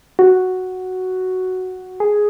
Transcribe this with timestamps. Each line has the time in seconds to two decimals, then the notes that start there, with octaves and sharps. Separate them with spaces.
0.19 F#4
2.00 G#4